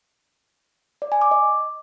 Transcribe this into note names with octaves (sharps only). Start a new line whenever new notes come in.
D5
G#5
D6
D#5